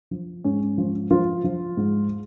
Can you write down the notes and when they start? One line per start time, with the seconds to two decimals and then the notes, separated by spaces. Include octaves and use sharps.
0.11 F3
0.44 G#2 C#4
0.78 F3
1.11 F3 F4
1.44 F3
1.77 G#2